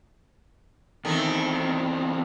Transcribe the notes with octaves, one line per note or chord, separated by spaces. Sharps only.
E2 D#3 A3 C4